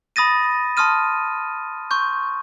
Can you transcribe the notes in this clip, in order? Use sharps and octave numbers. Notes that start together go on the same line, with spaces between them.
B5 D#6 A6 A#6 D#7
A5 C6 D#6 F6 D#7
C6 C#6 G6